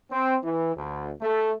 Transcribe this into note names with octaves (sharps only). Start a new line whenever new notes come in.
C4
E3
D2
A3